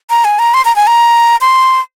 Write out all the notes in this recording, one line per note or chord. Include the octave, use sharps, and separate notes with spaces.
A#5
G#5
A#5
C6
A#5
G#5
A#5
C6